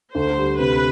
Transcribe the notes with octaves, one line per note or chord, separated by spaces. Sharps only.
D2 C5
G3
C3 B4